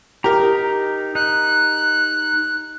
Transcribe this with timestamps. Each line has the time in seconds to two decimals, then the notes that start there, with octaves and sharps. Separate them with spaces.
0.24 D#4 G4 A#4 A#5
1.15 D#4 F#6